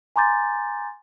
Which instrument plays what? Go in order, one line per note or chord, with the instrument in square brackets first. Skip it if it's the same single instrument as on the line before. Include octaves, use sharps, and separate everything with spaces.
[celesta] G#5 A#5 C6 D6 G6 A6